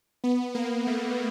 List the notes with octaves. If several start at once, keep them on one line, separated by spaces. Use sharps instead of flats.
B3
A#3
A3